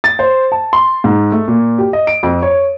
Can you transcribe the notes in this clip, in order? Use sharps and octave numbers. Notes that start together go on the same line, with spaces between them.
A6
C5
A5
C6
G#2
A3
A#2
G4
D#5
D7
F2
C#5